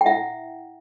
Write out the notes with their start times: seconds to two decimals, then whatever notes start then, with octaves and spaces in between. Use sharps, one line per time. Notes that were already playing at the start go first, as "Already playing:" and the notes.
0.01 G5
0.06 E4 E5 F#5